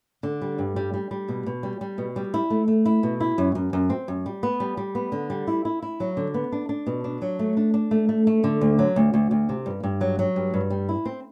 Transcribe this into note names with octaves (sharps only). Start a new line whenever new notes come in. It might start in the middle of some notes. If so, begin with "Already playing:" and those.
D3
G3
G2
G3
G3
G3
B2
B2
G3
G3
B2
G3
E4
A3
A3
E4
B2
E4
F#2
F#2
F#2
C4
F#2
G3
B3
G3
G3
B3
D3
G3
E4
E4
E4
F#3
D3
B3
D4
D4
B2
D4
F#3
A3
D4
D4
A3
A3
A3
D3
D2
F#3
D2
D2
D2
C3
G2
G2
F#3
F#3
G2
G2
G3
E4
C4